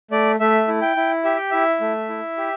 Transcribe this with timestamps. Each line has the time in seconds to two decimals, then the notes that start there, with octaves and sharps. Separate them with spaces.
0.11 A3 D5
0.40 A3 E5
0.68 E4
0.82 G5
0.97 E4
1.24 G4 E5
1.37 G5
1.51 E4 E5
1.81 A3
2.09 E4
2.37 G4